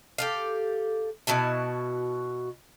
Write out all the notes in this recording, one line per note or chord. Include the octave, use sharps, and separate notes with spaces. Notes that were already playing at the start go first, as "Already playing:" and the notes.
G4 A4 F5
B2 E4 F#4 A5